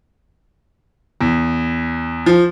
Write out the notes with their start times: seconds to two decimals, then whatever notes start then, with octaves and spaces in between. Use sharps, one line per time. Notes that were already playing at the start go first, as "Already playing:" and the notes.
1.21 E2
2.26 F3